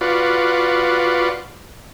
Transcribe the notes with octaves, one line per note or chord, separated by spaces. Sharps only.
F4 F#4 B4 D5